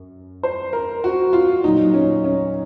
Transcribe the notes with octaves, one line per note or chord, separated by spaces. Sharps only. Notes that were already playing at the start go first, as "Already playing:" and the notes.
Already playing: F#2
C5
A#4
F#4
F4
A#2 F#3 D#4
C#4
C#4